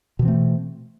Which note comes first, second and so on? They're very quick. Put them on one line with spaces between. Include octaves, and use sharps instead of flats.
B2 E3 C4 A3